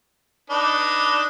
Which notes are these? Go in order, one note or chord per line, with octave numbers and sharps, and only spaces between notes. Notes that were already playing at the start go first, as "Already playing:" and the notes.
D4 D#4 B4